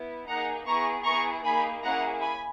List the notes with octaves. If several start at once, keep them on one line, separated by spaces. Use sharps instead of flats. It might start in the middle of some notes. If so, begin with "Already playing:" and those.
Already playing: B3 E4
A#3 D#4 G#4 F#5 A#5
B3 E4 G#4 A#5 C#6
B3 E4 G#4 A#5 C#6
A#3 D#4 G#4 G#5 B5
A#3 C#4 E4 G#4 F#5 A#5
G#5 B5